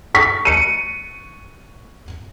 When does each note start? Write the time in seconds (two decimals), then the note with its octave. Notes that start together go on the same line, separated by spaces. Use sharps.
0.15 C#6 B6
0.45 C#7 D#7